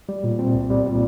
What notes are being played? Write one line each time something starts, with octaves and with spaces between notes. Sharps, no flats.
G3
A#2
C4
C2
G3
A#2